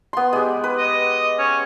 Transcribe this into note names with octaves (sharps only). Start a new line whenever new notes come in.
B3 C6
G#3 G4
B4
D#5
C#4